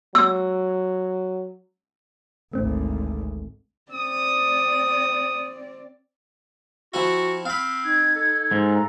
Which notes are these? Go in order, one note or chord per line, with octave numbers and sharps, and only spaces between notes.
F#3 E6
G#1 D2 A3 C4
C4 D5 D#6
F3 C4 E4 F#4
C4 F5 B5
D#4 G#6
A4
G#2
F5 A#5